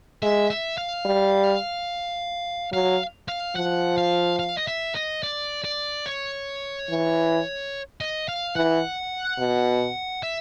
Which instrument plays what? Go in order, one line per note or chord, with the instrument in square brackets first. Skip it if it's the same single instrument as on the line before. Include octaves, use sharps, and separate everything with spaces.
[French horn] G#3 [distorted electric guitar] E5
[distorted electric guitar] E5
F5
[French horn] G3
[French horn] F#3 [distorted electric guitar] F5
[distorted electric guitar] F5
[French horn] F3 [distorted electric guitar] F#5
[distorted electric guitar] F5
F5
D#5
E5
D#5
D5
D5
C#5
[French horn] E3
[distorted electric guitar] D#5
F5
[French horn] E3 [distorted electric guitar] F#5
[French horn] B2
[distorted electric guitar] E5